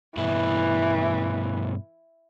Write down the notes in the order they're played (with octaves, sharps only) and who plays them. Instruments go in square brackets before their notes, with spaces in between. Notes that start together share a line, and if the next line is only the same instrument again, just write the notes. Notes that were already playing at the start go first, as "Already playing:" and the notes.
[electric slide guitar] G2 B2 E4 [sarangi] E3